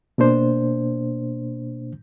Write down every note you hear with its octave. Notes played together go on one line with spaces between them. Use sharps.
B2 A#3 D4 C5